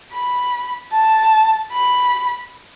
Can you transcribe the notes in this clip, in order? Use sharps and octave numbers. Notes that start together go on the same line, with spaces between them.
B5
A5
B5